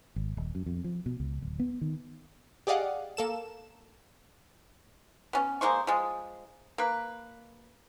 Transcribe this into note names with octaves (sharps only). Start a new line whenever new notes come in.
G#1
D#1
F#2
F2
F3
B2
C#2
D1
B3
D#3
G4 G#4 D5 D#5 F5 F#5
A#3 A4 E7
B3 C#4
G#3 A#3 C5 C#6
F3 G#3
A#3 B4